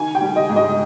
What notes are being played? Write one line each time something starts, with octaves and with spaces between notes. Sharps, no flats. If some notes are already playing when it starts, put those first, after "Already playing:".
Already playing: D#3 G#5
G5
G3
D#5
G#2
D#5